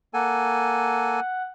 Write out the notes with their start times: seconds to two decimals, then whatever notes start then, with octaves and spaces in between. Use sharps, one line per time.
0.14 A#3 A4 F#5 G#5